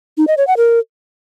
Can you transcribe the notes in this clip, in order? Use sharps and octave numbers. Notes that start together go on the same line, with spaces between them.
D#4
D#5
C#5
F#5
A#4